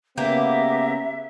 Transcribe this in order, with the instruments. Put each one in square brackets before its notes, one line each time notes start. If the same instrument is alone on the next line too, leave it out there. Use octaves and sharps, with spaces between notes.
[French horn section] C#3 B3 [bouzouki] A#3 G4 [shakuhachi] E5